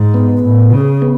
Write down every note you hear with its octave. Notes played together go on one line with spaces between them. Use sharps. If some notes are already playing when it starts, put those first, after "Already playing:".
Already playing: G#2
B3
A2
C#3
B3